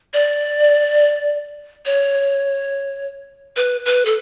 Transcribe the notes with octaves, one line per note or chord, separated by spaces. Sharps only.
D5
C#5
B4
B4
A4